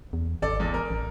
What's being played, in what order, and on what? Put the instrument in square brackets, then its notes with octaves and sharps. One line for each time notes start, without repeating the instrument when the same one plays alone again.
[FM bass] E2
[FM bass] G#1 [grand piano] A4 D5
[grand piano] E2
A#4
[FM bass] A1